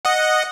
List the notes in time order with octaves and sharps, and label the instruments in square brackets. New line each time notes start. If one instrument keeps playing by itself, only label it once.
[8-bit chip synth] D#5 F#5